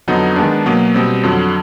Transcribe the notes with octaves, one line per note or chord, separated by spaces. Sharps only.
F2 D3 F#3 B3 D#4
D#3 G#3 B3 D4
B2 F#3 A#3
B2 G3 C4
F2 D3 F#3